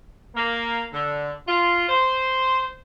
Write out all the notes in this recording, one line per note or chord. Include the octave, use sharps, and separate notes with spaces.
A#3
D3
F4
C5